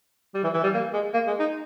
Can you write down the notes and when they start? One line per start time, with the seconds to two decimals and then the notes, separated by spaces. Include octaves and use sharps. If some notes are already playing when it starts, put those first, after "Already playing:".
0.34 G3
0.44 E3
0.54 E3
0.63 G3
0.74 A#3
0.93 G#3
1.14 A#3
1.27 G#3
1.40 D#4